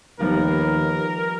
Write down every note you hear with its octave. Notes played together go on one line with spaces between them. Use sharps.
D#2 F3 G3 B3 A#4